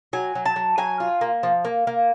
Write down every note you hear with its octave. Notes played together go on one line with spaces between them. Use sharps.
F#3 G#5
F#3
A5
F#3
F#3 G#5
F4
A#3
F3
A#3
A#3